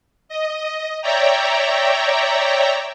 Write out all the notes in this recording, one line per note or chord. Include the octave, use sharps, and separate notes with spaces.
D#5
C#5 D5 E5 G5 A#5